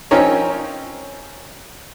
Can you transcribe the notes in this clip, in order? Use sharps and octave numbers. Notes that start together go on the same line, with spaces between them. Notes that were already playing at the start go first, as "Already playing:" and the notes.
F3 C4 C#4 D#4 A#4 C#5